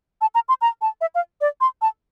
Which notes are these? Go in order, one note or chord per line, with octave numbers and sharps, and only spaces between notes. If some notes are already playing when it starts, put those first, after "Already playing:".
A5
A#5
C6
A#5
A5
E5
F5
D5
C6
A5